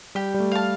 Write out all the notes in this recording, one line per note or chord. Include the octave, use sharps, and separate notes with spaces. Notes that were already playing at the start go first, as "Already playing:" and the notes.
G3 G4
G3
A3
F5 A5